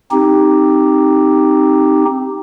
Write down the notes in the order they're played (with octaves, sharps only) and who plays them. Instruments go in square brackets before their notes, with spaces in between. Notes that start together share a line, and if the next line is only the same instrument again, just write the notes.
[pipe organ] C4 D#4 G4